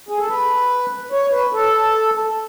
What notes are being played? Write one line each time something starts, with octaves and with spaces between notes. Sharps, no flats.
G#4
A4
B4
C#5
B4
A4